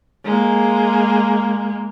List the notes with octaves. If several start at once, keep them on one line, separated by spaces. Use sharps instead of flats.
G#3 A#3